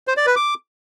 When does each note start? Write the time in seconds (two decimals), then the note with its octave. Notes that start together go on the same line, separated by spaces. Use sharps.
0.08 C5
0.17 D5
0.26 B4
0.36 D6